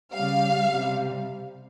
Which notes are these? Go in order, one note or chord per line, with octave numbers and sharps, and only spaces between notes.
C#3 G3 F5
C3 G3